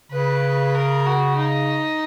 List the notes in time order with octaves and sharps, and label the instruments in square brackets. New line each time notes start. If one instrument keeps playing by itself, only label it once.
[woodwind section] C#3 [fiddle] B4
[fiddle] A#4
F#4
D#4